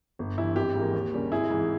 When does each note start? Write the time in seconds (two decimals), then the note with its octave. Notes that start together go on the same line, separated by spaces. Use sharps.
0.19 G1
0.38 G2 E3 E4
0.56 G#1 G4
0.75 G#2 E3 A#3
0.94 D#2
1.13 C#3 G3 A#3
1.32 G#1 E4 G#4
1.50 G#2 E3